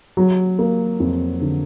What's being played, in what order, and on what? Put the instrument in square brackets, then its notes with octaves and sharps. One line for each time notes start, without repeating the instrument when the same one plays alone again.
[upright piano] F#3
A#3
F2
D3